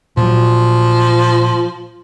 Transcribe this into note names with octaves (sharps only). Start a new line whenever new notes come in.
A#2 F3 F#3